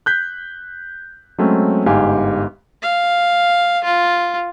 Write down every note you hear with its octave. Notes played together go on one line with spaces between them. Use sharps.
F#6 G6 B6
F#3 G#3 A3 C4 C#4
G1 G#2 G4 F5 G#5
F5
F4